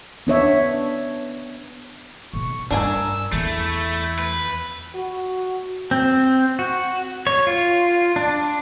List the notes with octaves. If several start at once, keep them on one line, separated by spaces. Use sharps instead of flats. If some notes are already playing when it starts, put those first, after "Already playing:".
B3 D4 C#5 E5
B1 C#6
G2 D4 A#4 G#5 E6
E2 A3 E4
B4
F#4
C4
F#4
C#5
F4
D4